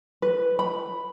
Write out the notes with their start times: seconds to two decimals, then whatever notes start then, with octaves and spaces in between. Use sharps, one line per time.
0.22 B4
0.59 B5